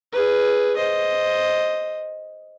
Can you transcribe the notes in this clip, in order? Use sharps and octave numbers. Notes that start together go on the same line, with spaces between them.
G#4 B4
C5 D#5